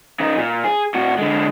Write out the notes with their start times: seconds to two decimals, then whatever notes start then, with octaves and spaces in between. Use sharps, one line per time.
0.20 C#3 D#4
0.37 A#2
0.64 G#4
0.94 A2 F#4
1.18 D3 G#3